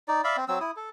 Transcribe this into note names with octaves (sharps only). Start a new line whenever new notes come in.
D#4 D5
D5 E5 F5 B5
C4
F#3 C4 E6
E4 D#6
A4